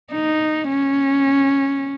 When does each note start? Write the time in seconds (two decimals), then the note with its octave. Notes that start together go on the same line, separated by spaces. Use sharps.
0.13 D#4
0.70 C#4